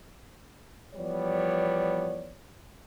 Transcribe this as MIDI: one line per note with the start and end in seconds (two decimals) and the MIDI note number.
0.95 2.33 40
0.95 2.33 53
0.95 2.33 55
0.95 2.33 59
0.95 2.33 73
0.95 2.33 74